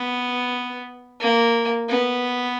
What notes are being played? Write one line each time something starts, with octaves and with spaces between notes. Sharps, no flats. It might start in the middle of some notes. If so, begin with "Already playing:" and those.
Already playing: B3
A#3
B3